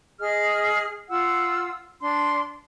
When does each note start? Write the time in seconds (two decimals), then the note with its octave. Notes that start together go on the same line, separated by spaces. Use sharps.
0.20 G#4 D#5 F6
1.08 F4 F#5 E6
2.01 D4 C6